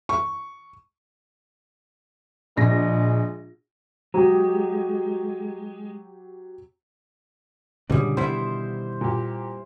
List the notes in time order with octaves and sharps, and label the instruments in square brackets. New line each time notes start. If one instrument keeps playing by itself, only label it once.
[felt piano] C#6
[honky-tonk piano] A#1 A#6 [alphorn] G#3
[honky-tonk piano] F#3 G4 [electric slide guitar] G#3
[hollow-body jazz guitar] C#2 G3 [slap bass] A#2 D4 [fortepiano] D3 G#4
[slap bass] B2 D#3 [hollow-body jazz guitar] G3 B3 E4 [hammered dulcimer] C5
[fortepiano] A#2 G4